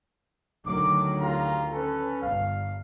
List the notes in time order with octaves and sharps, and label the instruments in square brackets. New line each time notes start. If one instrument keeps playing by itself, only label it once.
[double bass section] D2 D#3 F#3 [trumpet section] D6
[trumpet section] F4 G4 A#5
C#4 A4 B4
[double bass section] G1 [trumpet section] F5